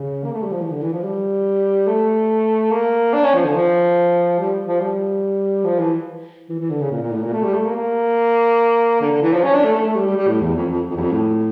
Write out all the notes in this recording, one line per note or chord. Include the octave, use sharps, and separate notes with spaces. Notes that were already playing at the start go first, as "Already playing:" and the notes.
Already playing: C#3
A#3
A3
G3
F3
E3
D3
E3
F3
G3
A3
A#3
D4
C#4
F3
D3
F3
G3
F3
G3
F3
E3
E3
E3
D3
C#3
A#2
A#2
A2
A#2
A3
G3
A3
A#3
A#3
D3
D3
E3
F3
C#4
D4
A3
A3
A3
G3
G3
G3
A2
E2
F2
F2
F2
E2
F2
A2